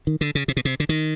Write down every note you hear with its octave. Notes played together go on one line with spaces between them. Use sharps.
D#3
D3
C#3
C3
B2
C3
D3
D#3